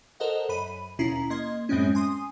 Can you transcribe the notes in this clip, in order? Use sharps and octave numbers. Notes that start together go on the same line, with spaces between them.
A4 A#4 C5 D#5 F#5
F#2 B5 D#7
D#2 B2 C#4 E4 A#5 C7
A#3 D#5 C6 G#6
F#2 A2 G#3 C4 C#4
G#5 C6 D#6